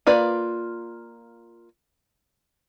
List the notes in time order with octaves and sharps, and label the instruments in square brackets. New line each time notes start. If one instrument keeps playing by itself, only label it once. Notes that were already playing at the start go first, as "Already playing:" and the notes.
[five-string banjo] A#3 F4 B4 D5